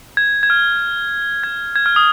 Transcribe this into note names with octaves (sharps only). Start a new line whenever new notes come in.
G#6
G#6
F6
G#6
G#6
F6
D#6